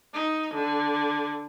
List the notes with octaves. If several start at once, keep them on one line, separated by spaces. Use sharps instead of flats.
D#4
D3